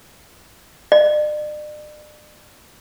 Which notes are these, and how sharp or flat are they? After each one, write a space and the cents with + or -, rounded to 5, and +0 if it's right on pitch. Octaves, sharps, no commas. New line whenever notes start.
D5 +40